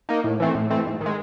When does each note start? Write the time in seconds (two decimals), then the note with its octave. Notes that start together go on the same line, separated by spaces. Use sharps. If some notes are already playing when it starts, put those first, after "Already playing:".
0.09 A#3 D#4
0.24 A2
0.40 E3 A3 C4
0.55 A2
0.70 E3 A3 C4
0.86 G#2
1.01 D#3
1.06 G#3